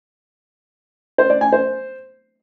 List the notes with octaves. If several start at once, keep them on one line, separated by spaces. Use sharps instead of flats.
C5
D5
G#5
C5